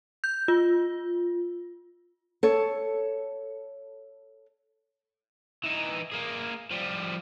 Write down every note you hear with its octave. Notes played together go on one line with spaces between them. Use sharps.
G6
F4
A4 C#5
E3 D#4
A#3 G#4
F3 G3